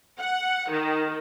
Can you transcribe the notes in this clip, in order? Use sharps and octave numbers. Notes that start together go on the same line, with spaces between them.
F#5
D#3